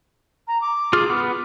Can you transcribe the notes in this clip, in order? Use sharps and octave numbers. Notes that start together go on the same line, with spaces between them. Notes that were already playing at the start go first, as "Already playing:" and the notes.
A#5
D6
F4 G#4 F6
B3